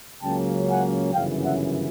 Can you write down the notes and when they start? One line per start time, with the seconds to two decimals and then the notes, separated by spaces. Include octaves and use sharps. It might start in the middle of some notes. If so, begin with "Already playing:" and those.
0.22 C#2 C#3 F#3 A#3 C#4 G5 A5
0.68 F#5 G#5
1.13 G1 F#2 C#3 E3 F5 G5
1.43 E5 F#5